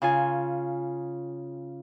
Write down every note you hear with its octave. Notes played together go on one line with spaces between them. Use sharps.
C#3 F4 G#5